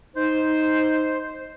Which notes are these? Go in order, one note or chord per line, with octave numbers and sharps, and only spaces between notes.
D#4 C5